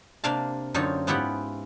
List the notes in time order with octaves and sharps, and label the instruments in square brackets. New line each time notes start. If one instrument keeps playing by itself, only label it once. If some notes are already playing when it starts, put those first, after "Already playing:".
[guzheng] C3 A#3 D4 D5 F5 A5
F#2 D3 C4 D#4 F4 C#5
G#2 B3 E4 F4 G4 F#5